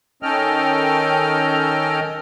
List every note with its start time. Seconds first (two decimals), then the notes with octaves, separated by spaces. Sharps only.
0.23 D#3 C#4 A4 D#5 G5 F6